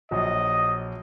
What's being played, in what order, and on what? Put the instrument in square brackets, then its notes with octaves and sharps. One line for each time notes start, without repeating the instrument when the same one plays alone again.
[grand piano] A#1 F#3 [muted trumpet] D#5